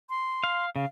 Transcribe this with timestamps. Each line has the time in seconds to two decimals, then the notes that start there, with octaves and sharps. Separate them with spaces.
0.10 C6
0.44 F5
0.76 C#3 F5